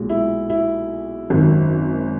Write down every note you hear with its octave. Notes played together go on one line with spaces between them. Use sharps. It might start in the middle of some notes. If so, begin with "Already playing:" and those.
Already playing: B1 A#2 G#3
E4
E4
G#1 F#2 D#3